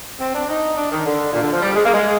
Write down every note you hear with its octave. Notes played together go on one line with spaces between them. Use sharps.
C4
D4
D#4
D4
D#3
D3
A#2
D3
F3
G3
G#3
A#3
G#3